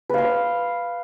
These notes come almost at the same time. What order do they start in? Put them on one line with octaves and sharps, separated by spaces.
B4 F5 C6